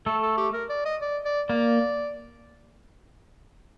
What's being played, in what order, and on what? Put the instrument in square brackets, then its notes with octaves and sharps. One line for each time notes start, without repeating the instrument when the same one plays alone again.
[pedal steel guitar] A3 [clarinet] A4
[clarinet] A4
G4
A#4
D5
D#5
D5
D5
[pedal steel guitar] A#3 [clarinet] D5